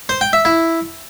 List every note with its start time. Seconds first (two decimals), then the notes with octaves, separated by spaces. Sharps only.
0.09 C5
0.21 G5
0.33 E5
0.45 E4